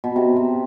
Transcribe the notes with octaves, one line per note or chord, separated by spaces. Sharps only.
B2
C3
C3